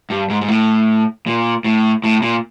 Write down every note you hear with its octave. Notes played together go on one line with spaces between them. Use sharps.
G2
G#2
G#2
A2
A#2
A2
A2
A#2